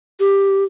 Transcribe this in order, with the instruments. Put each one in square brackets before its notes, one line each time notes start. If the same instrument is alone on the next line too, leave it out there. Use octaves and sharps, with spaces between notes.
[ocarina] G4